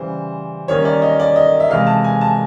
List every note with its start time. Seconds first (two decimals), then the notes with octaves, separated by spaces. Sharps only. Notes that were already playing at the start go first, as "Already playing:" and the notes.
Already playing: C#3 E3 G3 C5
0.68 D#3 G3 A#3 C#4 C#5
0.85 D5
1.02 D#5
1.20 D5
1.36 D#5
1.60 E5
1.69 C3 E3 G#3 F5
1.87 A5
2.04 G#5
2.21 A5